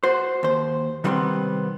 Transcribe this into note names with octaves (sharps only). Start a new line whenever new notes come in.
F#4 C5
D#2 C5
C3 D#3 G3 B3 C4 C6